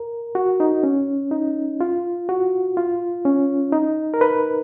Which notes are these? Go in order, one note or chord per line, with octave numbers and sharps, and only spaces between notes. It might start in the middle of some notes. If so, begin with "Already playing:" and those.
Already playing: A#4
F#4
D#4
C#4
D#4
F4
F#4
F4
C#4
D#4
A#4
B4